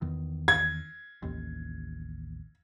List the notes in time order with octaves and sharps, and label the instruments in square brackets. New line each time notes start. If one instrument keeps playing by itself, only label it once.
[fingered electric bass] E2 D#3
[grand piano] G#6
[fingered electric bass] A1 D#2